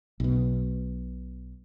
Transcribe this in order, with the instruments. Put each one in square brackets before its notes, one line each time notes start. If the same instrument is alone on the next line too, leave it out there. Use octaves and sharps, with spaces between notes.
[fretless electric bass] B1 B2